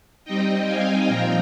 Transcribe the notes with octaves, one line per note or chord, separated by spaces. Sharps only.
G3 C4 D#4 D#5 G5
F5 G#5
A#2 F3 C4 F4 G5 A#5